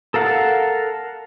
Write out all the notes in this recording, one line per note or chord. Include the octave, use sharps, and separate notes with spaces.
A4 A#4 F5 F#5 A5